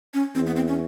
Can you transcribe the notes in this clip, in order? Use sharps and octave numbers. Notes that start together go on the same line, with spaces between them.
C#4
E2 C4
B3
C4
C#4